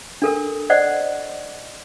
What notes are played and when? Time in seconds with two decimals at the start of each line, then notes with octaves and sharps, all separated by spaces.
0.22 D4 A4 A#4
0.70 C5 D5 D#5 F#5